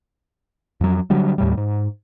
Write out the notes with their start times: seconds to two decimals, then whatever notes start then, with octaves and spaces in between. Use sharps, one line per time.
0.81 F2 F#3
1.10 D3 F#3 G3
1.38 D#2 A2 G3
1.57 G#2